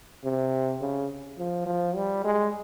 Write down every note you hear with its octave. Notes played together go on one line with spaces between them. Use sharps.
C3
C#3
F3
F3
G3
G#3